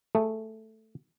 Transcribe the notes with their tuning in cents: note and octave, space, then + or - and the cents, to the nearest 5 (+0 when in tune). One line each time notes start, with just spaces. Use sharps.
A3 +0 G#4 +0